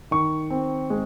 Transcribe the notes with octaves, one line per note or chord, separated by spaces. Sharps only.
D#3 C#6
C4
G#3